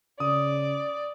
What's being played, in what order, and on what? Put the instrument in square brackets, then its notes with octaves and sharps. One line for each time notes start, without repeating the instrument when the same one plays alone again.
[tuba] C#3 [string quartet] D5 [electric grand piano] D#6